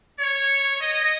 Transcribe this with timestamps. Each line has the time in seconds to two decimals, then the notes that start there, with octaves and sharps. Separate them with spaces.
0.19 C#5
0.81 D#5